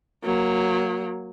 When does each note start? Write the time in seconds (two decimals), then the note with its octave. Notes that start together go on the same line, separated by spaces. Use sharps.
0.24 F#3 A#3